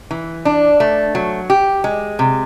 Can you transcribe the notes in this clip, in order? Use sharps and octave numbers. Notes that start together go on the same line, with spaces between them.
E3
D4
A3
F#3
G4
G#3
C3